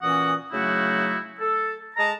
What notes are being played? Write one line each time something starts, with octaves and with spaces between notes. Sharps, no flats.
A#2 E3 C#4 F#4 F#5 D#6
C#3 F#3 A3 D#4 E4 F#4
A4
G#3 D#5 A5 A#5